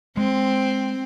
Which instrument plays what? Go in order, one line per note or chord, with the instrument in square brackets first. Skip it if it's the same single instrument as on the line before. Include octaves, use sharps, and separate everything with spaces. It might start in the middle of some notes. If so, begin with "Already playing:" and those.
[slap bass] G#3 [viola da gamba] C4